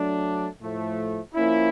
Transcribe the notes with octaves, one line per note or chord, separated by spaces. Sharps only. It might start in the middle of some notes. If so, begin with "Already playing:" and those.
Already playing: F#3 A3 D4
A2 F3 A3
F3 A#3 C#4 E4